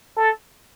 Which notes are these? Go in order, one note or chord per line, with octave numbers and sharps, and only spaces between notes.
A4